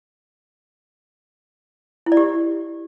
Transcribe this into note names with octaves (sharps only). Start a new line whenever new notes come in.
E4
D5
G4